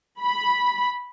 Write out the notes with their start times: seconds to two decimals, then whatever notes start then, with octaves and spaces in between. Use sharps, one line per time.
0.21 B5